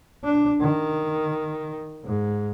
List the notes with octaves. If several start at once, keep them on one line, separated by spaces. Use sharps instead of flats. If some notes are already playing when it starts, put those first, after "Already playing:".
D4
D#3
G#2